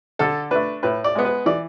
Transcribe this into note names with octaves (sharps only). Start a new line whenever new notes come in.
D3 A4
A3 D4 B4
A2 B4
D5
G#3 B3
B4
E3 D5